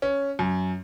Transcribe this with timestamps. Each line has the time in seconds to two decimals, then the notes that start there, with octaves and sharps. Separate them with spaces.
0.02 C#4
0.39 F#2